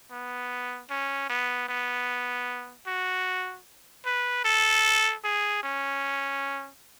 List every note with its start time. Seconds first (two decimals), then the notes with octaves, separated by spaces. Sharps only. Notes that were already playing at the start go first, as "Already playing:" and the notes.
0.11 B3
0.90 C#4
1.30 B3
1.69 B3
2.87 F#4
4.06 B4
4.45 A4
5.24 G#4
5.64 C#4